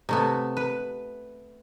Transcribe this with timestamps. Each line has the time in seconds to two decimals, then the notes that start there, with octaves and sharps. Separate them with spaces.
0.09 C3 A3 B3
0.57 B4